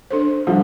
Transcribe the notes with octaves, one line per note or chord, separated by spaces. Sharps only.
D4 A4 C5
D3 F3 G3